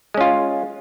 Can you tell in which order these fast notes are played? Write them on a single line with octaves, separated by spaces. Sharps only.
G#3 C#4 F4